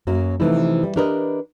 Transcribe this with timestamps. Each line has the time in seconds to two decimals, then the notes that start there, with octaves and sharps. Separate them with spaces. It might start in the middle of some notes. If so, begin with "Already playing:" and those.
0.07 F#2 F#3 A#3
0.40 C3 E3 F3 A3 D#4 E4
0.83 G3
0.96 D4 G4 A#4 B4 C#5 D#5